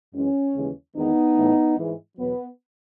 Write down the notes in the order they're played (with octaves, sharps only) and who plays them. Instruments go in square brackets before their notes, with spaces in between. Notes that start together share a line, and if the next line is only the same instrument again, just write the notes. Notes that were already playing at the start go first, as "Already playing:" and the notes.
[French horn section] F#2 E3 G#3 C#4
D#2 C#3 E3 G#3
E2 D#3 G#3 B3 D#4
A2 E3 A3
G#2 E3 G#3
E2 B2 F#3 B3